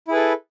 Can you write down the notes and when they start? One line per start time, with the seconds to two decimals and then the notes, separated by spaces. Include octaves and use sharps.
0.08 E4
0.10 G#4
0.13 B4
0.15 A4